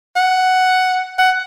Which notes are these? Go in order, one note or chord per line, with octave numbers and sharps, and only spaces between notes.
F#5
F#5